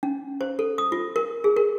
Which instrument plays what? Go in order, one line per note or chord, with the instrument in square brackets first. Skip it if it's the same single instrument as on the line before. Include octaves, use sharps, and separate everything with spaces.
[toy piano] C#4
C5
A4
D#6
F4
A#4
G#4
A#4